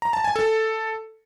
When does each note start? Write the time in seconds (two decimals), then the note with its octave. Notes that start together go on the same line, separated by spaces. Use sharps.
0.02 A#5
0.13 A5
0.24 G#5
0.36 A4